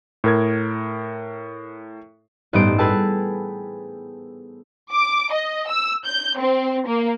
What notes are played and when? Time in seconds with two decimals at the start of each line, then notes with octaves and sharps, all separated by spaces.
0.24 A2 A#4 G#6
2.53 A1 G2 B3 D#4 C5 D7
2.78 G#4 A4 B4 G5 A5 E6
4.92 D6
5.32 D#5
5.68 E6
6.04 G6
6.39 C4
6.87 A#3